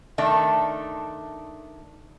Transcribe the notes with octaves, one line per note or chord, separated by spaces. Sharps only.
D#3 A3 D4